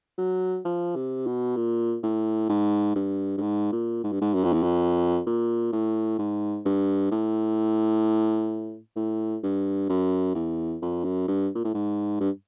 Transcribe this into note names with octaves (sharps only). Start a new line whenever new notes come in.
F#3
F3
C3
B2
A#2
A2
G#2
G2
G2
G#2
A#2
G#2
G2
G#2
F#2
F2
E2
F2
A#2
A2
G#2
G2
A2
A2
G2
F#2
E2
F2
F#2
G2
A#2
A2
G#2
G2